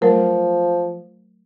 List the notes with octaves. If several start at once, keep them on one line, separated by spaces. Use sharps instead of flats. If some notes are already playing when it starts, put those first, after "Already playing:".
F3 F#3 A3 A#4